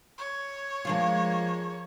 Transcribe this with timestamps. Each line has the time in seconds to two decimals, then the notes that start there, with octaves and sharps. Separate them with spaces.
0.18 C#5
0.85 F3 G#3 A#3 D4 F4